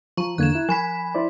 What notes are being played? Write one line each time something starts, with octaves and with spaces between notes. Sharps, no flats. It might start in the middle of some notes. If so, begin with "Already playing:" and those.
F3 A#5 C#6
E2 D3 A#3 F#6 G#6 E7
E4
F3 G#5 B5 B6
E4 C5 D5